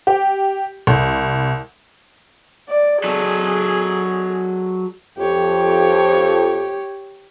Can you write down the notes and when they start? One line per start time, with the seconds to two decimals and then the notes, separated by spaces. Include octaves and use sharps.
0.07 G4
0.87 C2
2.69 D5
3.04 F#3 G#4 A4
5.18 F2 G4 C#5